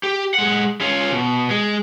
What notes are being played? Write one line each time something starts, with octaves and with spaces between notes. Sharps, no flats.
G4
G#3 F#5
C#4 F4
B2
G#3